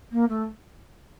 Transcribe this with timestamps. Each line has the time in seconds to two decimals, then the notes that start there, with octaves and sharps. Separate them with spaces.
0.12 A#3
0.29 A3